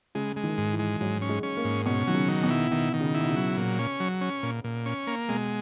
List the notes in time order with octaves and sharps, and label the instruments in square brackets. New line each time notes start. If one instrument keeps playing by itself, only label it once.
[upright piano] C#3 [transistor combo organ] G#3
[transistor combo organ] G#3
[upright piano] D#3
[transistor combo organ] G#2
[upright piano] E3
[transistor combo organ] G#3
[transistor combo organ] G#2 [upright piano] F#3
[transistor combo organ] C#4
[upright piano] G#3
[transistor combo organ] C#4
[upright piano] A#3
[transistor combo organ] G#2
[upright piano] B2 [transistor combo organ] C#4
[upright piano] D#3 [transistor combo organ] F#3
[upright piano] C#3
[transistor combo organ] D#3
[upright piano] B2
[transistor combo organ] E4
[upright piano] B2 [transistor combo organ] D#3
[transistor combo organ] D#3
[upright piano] C#3
[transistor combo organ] E4
[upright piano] B2
C#3
[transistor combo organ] F#3
A#2
C#4
F#3
C#4
A#2
A#2
C#4
A#3
[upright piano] B2 [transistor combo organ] G#3